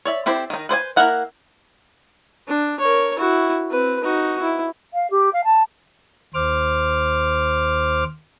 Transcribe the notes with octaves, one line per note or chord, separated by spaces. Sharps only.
C#5 D5 E5
C4 E4 G4 A4 C5
D#3 D#4
B4 C5 D5 G#5
A#3 E4 A#4 F#5 A#5
D4
A#4 C#5
E4 F#4
C4 B4
D#4 F#4
E4
F5
G4
F5
A5
D#2 C5 D6 F6